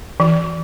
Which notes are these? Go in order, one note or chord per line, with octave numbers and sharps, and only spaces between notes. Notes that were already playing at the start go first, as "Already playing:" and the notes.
E3